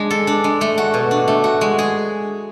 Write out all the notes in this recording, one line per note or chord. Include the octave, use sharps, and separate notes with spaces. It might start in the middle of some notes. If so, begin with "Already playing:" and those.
Already playing: G#3 D4
A4
D4
G#3
A3
F#4
B2
D4
A3
F#4
G#3
G#4